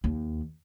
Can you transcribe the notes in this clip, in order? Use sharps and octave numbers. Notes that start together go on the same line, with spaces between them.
D#2